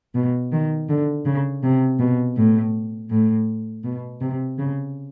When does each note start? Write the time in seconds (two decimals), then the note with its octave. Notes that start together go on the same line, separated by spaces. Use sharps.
0.14 B2
0.51 D#3
0.89 D3
1.25 C#3
1.63 C3
1.99 B2
2.36 A2
3.10 A2
3.84 B2
4.20 C3
4.58 C#3